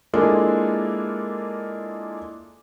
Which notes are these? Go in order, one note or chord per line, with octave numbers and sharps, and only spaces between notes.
G#3 A#3 D4 E4 F4 A4